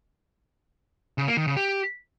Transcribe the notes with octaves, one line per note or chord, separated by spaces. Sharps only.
C#3
A#3
D#3
C#3
G4